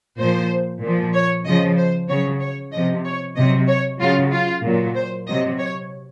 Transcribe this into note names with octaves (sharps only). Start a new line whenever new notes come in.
A#2 F3 C5
A#2 F3
C#5
C#3 F3 D#5
C5
C#3 F#3 C#5
C#5
C3 F3 D#5
C#5
C3 F#3 D#5
C#5
C#3 F#3 F4
F4
A#2 F#3
C5
C3 F#3 D#5
C#5